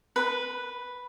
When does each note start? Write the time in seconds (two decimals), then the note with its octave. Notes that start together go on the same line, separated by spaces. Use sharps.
0.16 B4